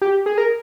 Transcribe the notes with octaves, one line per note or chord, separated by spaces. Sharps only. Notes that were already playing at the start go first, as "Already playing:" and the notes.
G4
G#4
A#4